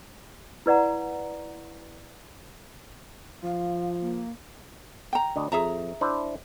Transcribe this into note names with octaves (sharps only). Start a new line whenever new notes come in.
E4 B4 D5 F#5 A#5
F3 F5
A#3
G5 A#5
D2 D4 D#5
F2 G#4 E5 A#5
D4 E4 C5